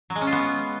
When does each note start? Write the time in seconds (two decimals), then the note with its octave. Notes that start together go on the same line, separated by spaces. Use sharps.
0.10 F#3
0.16 G#3
0.21 C#4
0.27 F4
0.32 B3